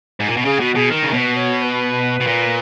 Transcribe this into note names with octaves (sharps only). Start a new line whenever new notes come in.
G#2
A#2
B2
C#3 G#4
B2 F#4
B2 G#4
D#3 A#4
C#3
B2 B4 C#5
C#5
C#5
B4
B2
A#2